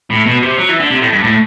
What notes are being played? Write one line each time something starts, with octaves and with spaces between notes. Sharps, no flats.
A2
B2
C3
F#3
E3
D3
C3
A2
G2
A2